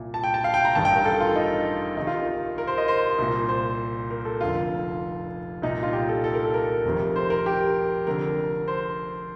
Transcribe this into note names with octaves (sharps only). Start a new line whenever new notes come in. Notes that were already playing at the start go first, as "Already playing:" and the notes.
Already playing: C2 A#2
A5
G5
A5
F5
G5
A#5
A1 G2 D#3 A5
G5
A#4
A4
F4
D#4
C2 C3 D#3 D#4
F4
A#4
C5
D#5
C5
C2 A#2
C5
A#4
A4
F1 F2 D3 F4
C2 A#2 D#4
F4
G4
A4
A4
A#4
A4
A#4
F1 F2 C3 D#3
C5
A#4
G4
F1 F2 D3 A#4
C5